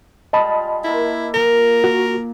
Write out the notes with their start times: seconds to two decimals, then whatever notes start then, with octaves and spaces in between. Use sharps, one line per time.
0.33 G3 G#3 F4 D#5 A5 B5
0.84 A#3 E4 A4
1.34 A#2 A#4
1.84 F#4